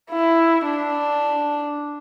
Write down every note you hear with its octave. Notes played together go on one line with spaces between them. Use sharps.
E4
D4